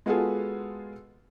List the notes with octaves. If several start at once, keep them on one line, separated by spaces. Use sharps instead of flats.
G#3 B3 F4 F#4 G#4 A4